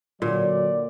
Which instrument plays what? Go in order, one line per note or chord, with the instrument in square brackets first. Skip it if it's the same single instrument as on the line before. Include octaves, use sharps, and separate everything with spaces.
[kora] A#2 [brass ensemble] D3 F#3 [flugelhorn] D5